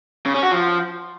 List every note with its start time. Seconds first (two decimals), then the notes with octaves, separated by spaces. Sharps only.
0.26 C#3
0.34 C#4
0.43 F#4
0.51 F3